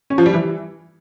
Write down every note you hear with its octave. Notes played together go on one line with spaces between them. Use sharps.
C#4
F3
G3
E3